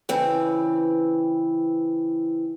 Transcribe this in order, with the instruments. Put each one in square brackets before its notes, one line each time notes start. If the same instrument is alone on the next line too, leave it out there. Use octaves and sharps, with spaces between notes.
[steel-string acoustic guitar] C#3 E3 C4